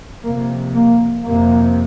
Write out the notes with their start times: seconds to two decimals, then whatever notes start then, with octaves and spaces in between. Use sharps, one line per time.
0.23 F2 C3 A#3
0.74 A#3
1.23 F2 C3 A#3